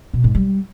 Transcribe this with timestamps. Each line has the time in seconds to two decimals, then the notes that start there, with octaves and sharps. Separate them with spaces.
0.14 B2
0.24 G#2
0.35 G3